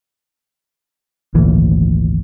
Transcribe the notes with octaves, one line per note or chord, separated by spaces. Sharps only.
G#1 D2 A#2 E3